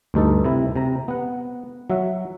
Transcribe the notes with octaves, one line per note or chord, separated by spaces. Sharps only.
D2 G2 D#4 A4
C3 E4
C3 A#5
B3 F#5
F#3 E5 F#5